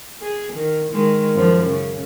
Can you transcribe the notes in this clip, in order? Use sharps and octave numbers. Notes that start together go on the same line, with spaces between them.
G#4
D#3
D#3 G#3
F#2 F3
C#3